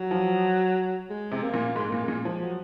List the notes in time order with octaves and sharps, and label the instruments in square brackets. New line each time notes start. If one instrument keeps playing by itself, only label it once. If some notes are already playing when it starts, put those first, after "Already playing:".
Already playing: [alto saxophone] F#3
[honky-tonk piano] F3
[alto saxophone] G#3
[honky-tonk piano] C3
[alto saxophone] A#3
[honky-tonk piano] A#2
[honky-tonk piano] G#2 [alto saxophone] G#3
[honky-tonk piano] A#2 [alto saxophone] A#3
[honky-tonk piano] A#2 [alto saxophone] G#3
[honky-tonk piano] F3
[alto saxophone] F#3